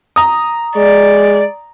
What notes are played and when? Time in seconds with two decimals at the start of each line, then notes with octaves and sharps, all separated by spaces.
0.16 A#5 D#6
0.76 G#3 D5